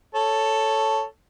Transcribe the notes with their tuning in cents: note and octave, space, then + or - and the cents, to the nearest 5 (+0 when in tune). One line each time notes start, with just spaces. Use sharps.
A4 +0 C#5 +0